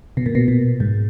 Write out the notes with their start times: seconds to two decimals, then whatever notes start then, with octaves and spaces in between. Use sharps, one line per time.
0.17 B2
0.26 A#2
0.35 B2
0.48 A#2
0.80 G#2